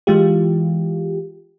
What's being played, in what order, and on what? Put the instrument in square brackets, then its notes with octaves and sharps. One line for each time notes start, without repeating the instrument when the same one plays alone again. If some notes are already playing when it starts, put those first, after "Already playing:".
[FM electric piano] E3 G#3 F4 G4